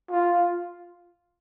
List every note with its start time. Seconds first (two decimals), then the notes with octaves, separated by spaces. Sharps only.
0.10 F4